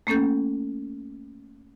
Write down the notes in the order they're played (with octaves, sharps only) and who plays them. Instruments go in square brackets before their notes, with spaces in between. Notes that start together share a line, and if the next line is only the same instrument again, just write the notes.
[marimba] A3 A#3 C#4 A4 G6